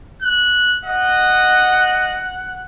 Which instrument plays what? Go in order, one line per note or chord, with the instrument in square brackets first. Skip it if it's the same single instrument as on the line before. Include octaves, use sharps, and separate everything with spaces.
[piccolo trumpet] F#6
[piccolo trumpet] D#5 [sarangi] F#5